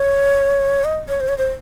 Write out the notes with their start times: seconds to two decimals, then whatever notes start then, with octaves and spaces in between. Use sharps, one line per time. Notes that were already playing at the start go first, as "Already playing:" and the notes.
Already playing: C#5
0.84 D#5
1.09 C#5
1.20 C5
1.28 C#5
1.38 C5